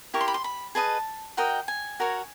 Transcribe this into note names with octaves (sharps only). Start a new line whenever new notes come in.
E4 G4 A#4 C#6
C6
B5
C6
B5
G#4 B4 D#5 A5
F#4 A#4 D#5 G5
G#5
F#4 A#4 C#5